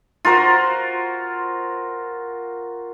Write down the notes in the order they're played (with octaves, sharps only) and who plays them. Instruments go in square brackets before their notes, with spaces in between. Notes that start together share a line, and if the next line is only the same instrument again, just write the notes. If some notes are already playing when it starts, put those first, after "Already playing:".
[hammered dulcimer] F4 F#4 A#4 C5